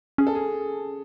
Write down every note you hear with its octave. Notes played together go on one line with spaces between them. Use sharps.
C#4 G#4
A4
G#4